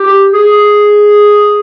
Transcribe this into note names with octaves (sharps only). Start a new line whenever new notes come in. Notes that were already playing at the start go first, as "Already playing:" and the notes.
Already playing: G4
G#4